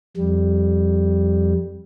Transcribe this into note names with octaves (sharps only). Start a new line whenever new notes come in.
F2 G3